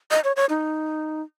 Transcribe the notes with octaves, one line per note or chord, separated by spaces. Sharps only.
D#5
C#5
C#5
D#4